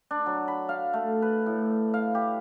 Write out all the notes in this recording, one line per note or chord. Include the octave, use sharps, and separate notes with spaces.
D4
F#3
B5
F5
A3
B4
A2
F5
G4